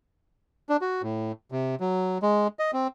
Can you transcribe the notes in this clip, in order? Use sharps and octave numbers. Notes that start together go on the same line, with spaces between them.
D4
F#4
A2
C3
F#3
G#3
D#5
C4